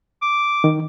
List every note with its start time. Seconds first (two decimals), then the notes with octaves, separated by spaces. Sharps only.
0.22 D6
0.64 D#3